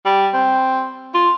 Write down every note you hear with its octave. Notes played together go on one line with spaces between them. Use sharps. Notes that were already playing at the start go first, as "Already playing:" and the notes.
G3
C4
F4